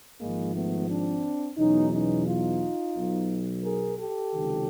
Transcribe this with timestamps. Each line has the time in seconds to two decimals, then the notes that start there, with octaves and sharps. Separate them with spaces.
0.20 G#1 G#2 F3 G#3 A#3
0.55 A3 B3
0.90 C4 D4
1.58 E2 B2 F#3 C#4 D#4
1.93 C#4 D#4
2.27 D#4 F4
2.96 B1 B2 F#3
3.64 G#4 A#4
3.98 G4 A4
4.33 C#2 C3 D#3 F#3